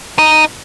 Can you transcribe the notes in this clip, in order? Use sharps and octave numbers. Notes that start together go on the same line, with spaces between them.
D#4